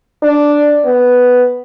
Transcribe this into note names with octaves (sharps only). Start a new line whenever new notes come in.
D4
B3